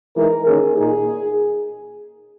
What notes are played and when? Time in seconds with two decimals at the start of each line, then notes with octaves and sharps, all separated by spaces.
0.16 E3 G#3 D#4 A#4
0.46 D#3 A#3 C#4 G#4
0.78 A#2 A#3 D#4 G#4